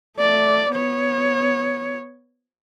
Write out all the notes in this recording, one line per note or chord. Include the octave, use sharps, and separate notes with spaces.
A3 D5
B3 C#5